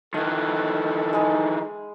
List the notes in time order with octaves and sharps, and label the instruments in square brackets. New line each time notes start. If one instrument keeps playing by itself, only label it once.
[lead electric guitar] D#3 E3 [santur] A3 F5 [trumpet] A4
[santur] G#3 G#4 B5 [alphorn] D#4